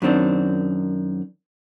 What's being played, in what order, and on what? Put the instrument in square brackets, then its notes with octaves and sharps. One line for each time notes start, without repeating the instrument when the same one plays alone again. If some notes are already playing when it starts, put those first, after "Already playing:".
[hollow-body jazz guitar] F#2 D#3 C4 D4